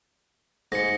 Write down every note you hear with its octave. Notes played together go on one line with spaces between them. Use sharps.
G#2 A#6 C#7